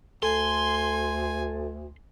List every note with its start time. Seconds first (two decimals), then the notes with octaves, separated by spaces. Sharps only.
0.23 D2 A4 G#5 C6